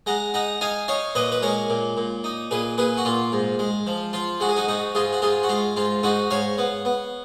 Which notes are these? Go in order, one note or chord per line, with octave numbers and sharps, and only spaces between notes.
G#3 F#5 A#5
D#4 F#5 A#5
D#4 F5 G#5
D#4 C#5 F5
A#2 B4 D#5
B4
G#3 A#4 C#5
A#2
A#2
D#4
A#2 G#4 B4
A#2 G#4 B4
F#4
A#2 F4
G#2
G#3
F3
F3 F4
G#3 F#4
G#4
D#4 F#4
G#2 D#4 F#4
G#2 F4 G#4
F#4
G#2 F4 G#4
F#4
G#3 F4
G#2 F4
G#2 D#4 F#4
G#2 C#5 F5
B3
B3